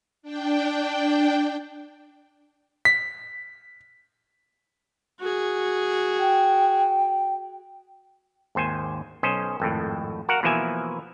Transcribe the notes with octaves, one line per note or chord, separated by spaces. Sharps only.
D4 G5
B6
F#4 G#4
G5
G#1 D#2 C5 G#5
B1 C#4 C5 D#5
G#1 F2 A2
F#4 A#4 F5 F#5
B2 E3 F3 A#3 E5 G#5